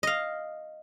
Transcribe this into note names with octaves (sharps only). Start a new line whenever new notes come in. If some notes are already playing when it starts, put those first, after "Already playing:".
D#5 F5